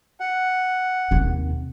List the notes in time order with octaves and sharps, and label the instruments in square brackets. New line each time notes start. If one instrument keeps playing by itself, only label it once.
[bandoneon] F#5
[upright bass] D#2 C3